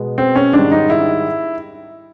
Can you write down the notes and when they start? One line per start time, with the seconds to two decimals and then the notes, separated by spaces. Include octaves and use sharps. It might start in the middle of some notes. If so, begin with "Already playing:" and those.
Already playing: B2 G#3 B3
0.18 C4
0.36 C#4
0.53 G#2 D#3 G3 D4
0.72 D#4
0.90 E4